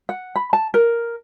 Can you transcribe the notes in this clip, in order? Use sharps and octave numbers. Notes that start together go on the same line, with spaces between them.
F#5
B5
A5
A#4